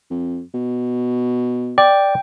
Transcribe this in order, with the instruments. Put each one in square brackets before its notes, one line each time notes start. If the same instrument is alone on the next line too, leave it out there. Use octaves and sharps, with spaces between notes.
[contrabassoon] F2
B2
[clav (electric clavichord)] D5 [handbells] G5